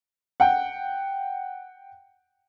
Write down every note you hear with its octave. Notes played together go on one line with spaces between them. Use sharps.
F#5 G5